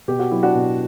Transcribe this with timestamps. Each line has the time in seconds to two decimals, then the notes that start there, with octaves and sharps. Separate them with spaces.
0.08 B2 G4
0.19 F#4
0.32 F#3 E4
0.43 D4 F#4
0.55 B2